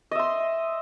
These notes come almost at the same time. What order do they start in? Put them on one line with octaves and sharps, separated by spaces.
D#5 E5 C6